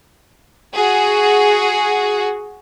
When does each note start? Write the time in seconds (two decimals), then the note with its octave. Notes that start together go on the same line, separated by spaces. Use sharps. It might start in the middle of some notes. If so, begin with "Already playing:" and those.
0.74 F#4 G#4